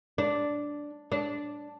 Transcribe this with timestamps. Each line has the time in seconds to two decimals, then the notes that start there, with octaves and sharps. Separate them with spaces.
0.18 D4
1.12 D4